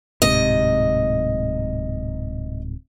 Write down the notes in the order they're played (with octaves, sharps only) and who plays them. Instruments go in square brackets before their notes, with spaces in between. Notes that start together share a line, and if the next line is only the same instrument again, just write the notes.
[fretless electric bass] D1 G#2 C3 [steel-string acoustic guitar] D#5